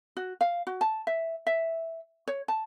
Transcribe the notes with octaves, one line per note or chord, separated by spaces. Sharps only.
F#4
F5
F#4
A5
E5
E5
C#5
A5